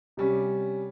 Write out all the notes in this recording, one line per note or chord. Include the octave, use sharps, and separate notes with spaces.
C3 G3 C#4